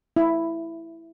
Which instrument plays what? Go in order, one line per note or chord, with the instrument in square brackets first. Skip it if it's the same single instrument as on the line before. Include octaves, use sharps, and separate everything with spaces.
[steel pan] E4